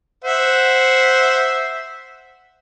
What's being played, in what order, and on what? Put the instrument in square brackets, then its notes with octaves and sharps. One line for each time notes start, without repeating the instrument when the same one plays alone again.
[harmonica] C5 E5 F#5